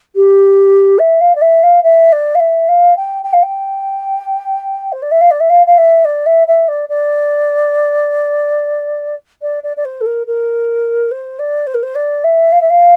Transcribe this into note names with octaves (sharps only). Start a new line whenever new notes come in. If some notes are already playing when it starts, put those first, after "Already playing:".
G4
E5
F5
D5
E5
F5
E5
D5
F5
E5
F5
G5
G5
F5
G5
C5
D5
E5
F5
D5
E5
F5
F5
E5
D5
E5
E5
D5
D5
D5
D5
D5
C5
A4
A#4
A#4
C5
D5
C5
A#4
C5
D5
E5
F5
E5
F5